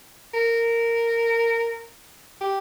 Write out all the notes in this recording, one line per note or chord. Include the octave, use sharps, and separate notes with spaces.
A#4
G4